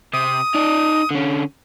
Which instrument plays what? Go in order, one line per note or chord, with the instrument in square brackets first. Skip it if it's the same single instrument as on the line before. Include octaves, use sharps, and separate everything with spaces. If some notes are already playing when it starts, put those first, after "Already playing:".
[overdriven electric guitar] C3 [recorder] D#6
[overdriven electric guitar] D#4 D5
D3 C#4